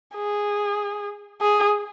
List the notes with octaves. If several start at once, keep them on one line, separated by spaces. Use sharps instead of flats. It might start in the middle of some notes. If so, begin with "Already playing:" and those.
G#4
G#4